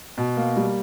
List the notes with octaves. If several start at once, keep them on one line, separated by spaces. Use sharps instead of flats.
B2
A#3
G3